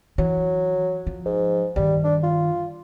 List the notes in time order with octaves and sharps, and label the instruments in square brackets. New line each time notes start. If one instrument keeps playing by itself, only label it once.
[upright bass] E3 [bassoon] F#3
[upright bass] F3
[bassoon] G#2
[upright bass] G2 D#3 [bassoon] G3
[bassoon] D4
F4